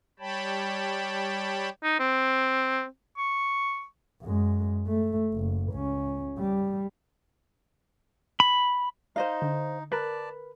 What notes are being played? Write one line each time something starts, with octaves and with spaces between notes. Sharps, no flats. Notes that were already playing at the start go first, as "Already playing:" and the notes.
G3 C#5 G5 A5 B5
D#4
C4
C#6
F#2 G#3
A3
F#1
C#2 C#4
G3
B5
D#4 C5 D#5 F5
D3
A#4 B4 D5 A5